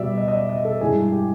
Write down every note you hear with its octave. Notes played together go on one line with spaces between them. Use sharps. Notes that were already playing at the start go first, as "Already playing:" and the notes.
Already playing: B2 G3 D5 E5
D#5
D#5
D5
D#5
A4
G2 E3 G#3 G#4
G4